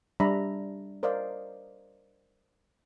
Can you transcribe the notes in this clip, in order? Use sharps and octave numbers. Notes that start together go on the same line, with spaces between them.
G3 D4 E5 A#5 B5
A#4 C5 D5 D#5 F5